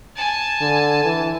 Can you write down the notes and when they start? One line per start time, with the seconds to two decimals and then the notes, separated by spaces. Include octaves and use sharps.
0.16 G#5 A5
0.61 D3
1.05 E3